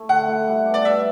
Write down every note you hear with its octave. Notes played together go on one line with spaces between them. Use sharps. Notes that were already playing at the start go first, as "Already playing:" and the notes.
Already playing: A3 E4
D3 F#5
A3 E4
G3
B3 D4
D5
G3 E5